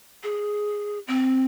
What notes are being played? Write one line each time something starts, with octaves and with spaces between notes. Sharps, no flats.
G#4
C4